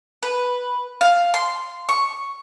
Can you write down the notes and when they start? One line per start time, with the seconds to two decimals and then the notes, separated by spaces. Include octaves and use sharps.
0.23 B4
1.01 F5
1.34 C6
1.89 C#6